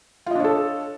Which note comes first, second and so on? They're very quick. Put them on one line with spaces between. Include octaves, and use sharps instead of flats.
F4 D#5 D4 C#5 A4